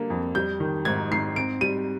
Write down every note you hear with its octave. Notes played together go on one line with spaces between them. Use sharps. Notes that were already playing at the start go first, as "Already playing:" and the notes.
Already playing: D3 G3 A#3
F2
G3 G6
D#3
G#2 G#6
G#2 C7
C4 D7
G3 D#7